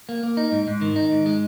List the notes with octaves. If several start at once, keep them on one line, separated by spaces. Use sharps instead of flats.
A#3
A#3
D#4
G#2
G#2
D#3
D#4
G#2
G#3